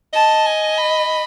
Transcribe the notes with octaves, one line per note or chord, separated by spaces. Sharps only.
D#5 A5
G#5
B5